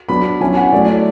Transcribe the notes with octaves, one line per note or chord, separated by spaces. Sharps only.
F#3 B3 D4 B5
F#3 C#4 E4 G#5
F#5
F#3 A3 E4 D5
D5